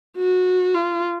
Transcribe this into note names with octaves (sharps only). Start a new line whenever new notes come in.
F#4
F4